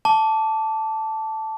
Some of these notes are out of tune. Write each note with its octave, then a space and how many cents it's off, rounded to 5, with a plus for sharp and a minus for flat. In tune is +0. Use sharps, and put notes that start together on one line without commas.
A5 +0 D6 -20